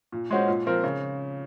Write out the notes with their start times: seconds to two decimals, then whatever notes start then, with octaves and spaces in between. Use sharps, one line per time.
0.12 A#2
0.31 G#3 C#4 F#4 C5
0.47 A#2
0.66 F3 C4 F4 A#4
0.84 C#3